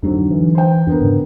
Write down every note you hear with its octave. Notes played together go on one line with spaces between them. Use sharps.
F2 G#2 D3 F#3
E3
C5 G5
F2 D3 B3 A#4
G#2 C#3